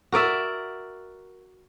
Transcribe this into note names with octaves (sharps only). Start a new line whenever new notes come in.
F#4 A#4 D5 E5